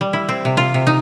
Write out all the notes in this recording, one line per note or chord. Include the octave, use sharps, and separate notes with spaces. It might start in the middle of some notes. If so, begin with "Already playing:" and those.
G3
E4
C4
C3
F4
C3
D#4